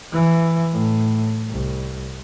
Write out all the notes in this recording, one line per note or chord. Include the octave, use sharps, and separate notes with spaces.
E3
A2
C2